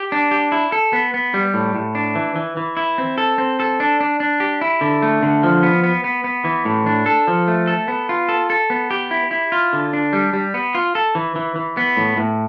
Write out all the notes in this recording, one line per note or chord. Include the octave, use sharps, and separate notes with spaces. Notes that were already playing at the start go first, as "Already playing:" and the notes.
Already playing: G4
D4
G4
E4
A4
B3
B3
G3
A2
A2
D4
E3
E3
E3
E4
C4
A4
C4
A4
D4
D4
D4
G4
E4
D3
A3
D3
F3
B3
B3
B3
B3
E3
A2
D4
A4
F3
A3
A4
B3
F4
A4
A4
B3
G4
E4
E4
F4
D3
D4
G3
G3
B3
F4
A4
E3
E3
E3
B3
A2
A2